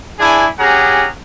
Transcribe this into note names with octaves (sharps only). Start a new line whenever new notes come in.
D4 E4 G#4 G#5
C#4 G4 G#4 F#5 A#5